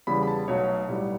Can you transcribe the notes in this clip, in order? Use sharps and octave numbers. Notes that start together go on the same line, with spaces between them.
E2 C#3 G3 B3 B5
B5
A5
B1 B2 F#3 A3 C#5
B1 A2 G3 B3